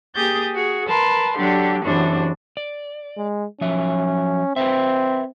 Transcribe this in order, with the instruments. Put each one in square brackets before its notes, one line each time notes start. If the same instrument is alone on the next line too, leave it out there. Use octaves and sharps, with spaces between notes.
[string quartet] A#3 G4 G#4 D#6 G6 A6
F#4 G#4
A#4 B4 A5 C6
D3 F#3 D4 G4
F#2 A2 C3 E3 D4 F#4
[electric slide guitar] D5
[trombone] G#3
[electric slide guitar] F3 F#3 E5 [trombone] C#4
[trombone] C4 [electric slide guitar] B4 C5 E5